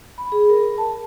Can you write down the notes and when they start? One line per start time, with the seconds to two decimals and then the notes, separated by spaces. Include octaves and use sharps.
0.18 B5
0.32 G#4
0.49 A#4
0.78 A5